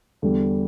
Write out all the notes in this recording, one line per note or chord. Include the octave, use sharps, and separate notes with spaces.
E2 D3 G3